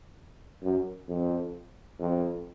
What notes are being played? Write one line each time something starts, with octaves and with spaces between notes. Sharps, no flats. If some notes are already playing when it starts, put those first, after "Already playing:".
F#2
F2
F2